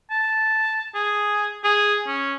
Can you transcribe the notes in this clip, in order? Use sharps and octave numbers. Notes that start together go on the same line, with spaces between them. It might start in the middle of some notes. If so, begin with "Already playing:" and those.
A5
G#4
G#4
C#4